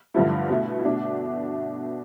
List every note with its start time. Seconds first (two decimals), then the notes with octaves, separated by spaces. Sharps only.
0.14 G2 D3 F3 A3 E4
0.50 B2 A3
0.79 E4
0.85 B2 A3 D4